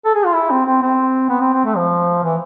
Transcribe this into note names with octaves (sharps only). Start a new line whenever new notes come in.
A4
G#4
F4
E4
C4
C4
C4
B3
C4
C4
A3
F3
E3